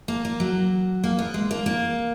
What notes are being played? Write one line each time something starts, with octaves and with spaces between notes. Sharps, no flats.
A#3
A#3
F#3
A#3
B3
G#3
A#3
A#3